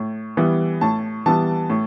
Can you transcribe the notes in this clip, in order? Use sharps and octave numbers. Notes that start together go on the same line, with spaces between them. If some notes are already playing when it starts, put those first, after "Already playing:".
Already playing: A2
E3 G3 B3
A2 A5
E3 G3 B3 A5
A2